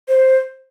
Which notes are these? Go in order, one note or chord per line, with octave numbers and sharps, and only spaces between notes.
C5